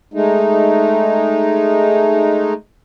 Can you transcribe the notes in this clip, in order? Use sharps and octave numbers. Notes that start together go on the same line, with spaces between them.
G#3 A3 D#4